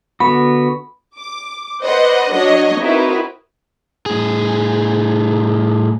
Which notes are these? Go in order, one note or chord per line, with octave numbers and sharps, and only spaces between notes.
D3 B3 F#4 B5
D6
B4 C5 D5 D#5 F#5
F#3 D4 C#5 D#5
C4 D#4 E4 F#4 A#4 B4
A2 G#4